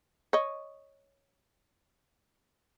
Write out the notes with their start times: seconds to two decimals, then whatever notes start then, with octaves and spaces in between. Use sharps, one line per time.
0.33 C#5 D#5